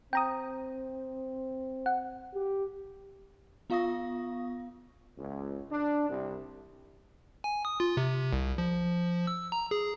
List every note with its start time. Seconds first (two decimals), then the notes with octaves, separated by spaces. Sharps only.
0.13 C4 G5 A#5 D#6
1.86 F#5
2.34 G4
3.70 B3 F4 F5 C#6 D#6 A#6
5.17 C#2
5.72 D4
6.09 C2
7.44 G#5
7.65 D#6
7.80 F4
7.97 C3
8.33 C2
8.58 F3
9.27 E6
9.52 A#5
9.71 G#4